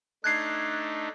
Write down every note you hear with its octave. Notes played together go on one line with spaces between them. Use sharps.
A3 D4 D#4 F#6 G#6 C7